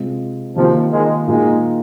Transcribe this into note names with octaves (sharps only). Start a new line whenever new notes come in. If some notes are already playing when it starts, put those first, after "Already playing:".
Already playing: C3 G#3 F4
C3 D#3 F3 A#3 F4
D#3 G#3
A#2 D#3 G#3 A#3 D#4